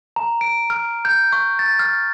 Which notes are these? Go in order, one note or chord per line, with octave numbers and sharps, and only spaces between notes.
A#5
D7
F6
G6
C#6
A6
F6